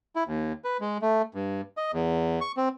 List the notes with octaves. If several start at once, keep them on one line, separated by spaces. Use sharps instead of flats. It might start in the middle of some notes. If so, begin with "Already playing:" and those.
E4
D#2
B4
G#3
A3
G2
D#5
E2
C#6
C4